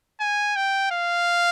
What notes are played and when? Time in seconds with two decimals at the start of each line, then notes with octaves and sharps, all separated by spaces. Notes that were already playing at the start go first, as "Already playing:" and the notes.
0.20 G#5
0.56 G5
0.92 F5